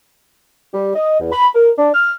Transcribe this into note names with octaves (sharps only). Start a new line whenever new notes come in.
G3
D#5
E2
B5
A#4
D4
F6